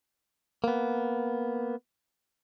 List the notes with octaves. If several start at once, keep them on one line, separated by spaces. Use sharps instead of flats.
A#3 B3